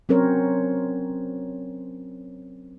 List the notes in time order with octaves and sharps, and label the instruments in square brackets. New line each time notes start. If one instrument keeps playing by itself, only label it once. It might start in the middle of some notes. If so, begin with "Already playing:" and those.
[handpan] F#3 C4 C#4 A#4 C5 C#5